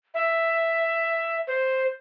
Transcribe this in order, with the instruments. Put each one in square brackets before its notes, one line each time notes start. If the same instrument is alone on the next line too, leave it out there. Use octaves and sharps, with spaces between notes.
[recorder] E5
C5